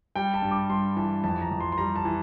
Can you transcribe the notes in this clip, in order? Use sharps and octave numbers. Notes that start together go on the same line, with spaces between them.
G3 G5
A5
G2
D6
G2 C6
E3 A5
F2 A5
A#5
F2
C6
C6
G3 A#5
A5
E3